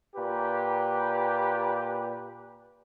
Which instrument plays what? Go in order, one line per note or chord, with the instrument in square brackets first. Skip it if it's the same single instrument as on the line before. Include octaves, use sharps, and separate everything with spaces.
[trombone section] A#2 G4 B4